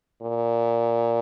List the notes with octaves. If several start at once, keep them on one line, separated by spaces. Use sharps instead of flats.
A#2